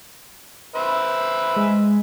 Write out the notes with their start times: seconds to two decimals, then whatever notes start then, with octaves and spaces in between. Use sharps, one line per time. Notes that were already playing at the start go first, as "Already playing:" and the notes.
0.75 B4 C5 E5
1.56 G#3